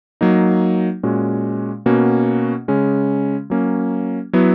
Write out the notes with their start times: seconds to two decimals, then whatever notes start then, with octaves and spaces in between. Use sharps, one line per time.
0.21 F#3 A#3 D#4
1.03 A#2 G#3 C#4 F#4
1.86 B2 A#3 C#4 F#4
2.68 C#3 G#3 C#4
3.50 F#3 A#3 C#4
4.33 F#3 B3 E4